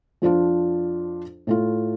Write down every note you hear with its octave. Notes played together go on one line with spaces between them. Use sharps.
F2 F3 D4 F4
A2 A3 F4